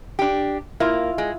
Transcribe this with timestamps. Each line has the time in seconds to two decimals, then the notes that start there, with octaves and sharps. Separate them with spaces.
0.19 D4 G4
0.80 A#3 E4 F4
1.18 G#3